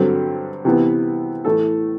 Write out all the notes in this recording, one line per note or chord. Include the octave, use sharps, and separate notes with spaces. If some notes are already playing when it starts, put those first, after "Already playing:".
Already playing: G2 D3 F#3 C4
C3 E3 B3
A2 E3 A3 A4